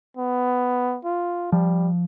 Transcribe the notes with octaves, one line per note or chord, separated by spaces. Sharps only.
B3
F4
F3 G3